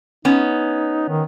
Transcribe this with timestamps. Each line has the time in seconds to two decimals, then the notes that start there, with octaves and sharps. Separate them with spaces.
0.25 B3 C#4 D#4
1.08 D#3